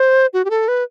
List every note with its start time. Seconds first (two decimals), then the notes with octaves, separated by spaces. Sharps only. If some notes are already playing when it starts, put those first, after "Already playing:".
Already playing: C5
0.33 F#4
0.45 G4
0.50 A4
0.68 B4